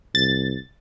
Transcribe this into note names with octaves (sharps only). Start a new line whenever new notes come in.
C2 A6